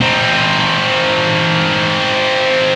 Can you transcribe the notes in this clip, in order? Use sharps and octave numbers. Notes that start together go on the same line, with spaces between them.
C4 D#4